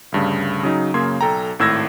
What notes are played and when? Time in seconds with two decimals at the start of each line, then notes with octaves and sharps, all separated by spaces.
0.12 D2 G2 C#3
0.63 C#3 F#3 D#4
0.94 F#2 C#3 A#3 C6 G#6
1.21 B1 A4 G5 A#5
1.59 G#1 A2 E6 G#6 A#6